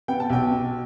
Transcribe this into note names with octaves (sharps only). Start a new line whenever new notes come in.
B3 G5
A5
B1 G5
B2